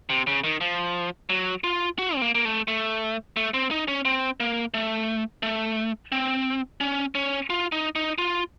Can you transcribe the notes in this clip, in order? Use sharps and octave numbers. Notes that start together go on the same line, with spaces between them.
C3
C#3
D#3
F3
F#3
F4
F#4
C4
A#3
A#3
A3
A3
A3
C4
D#4
C#4
C4
A#3
A3
A3
C4
C#4
C#4
F4
D#4
D#4
F4